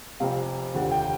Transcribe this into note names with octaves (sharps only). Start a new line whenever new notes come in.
F1 F2 C3 F3 C4 F5
F1 D#2 D3 F3
G5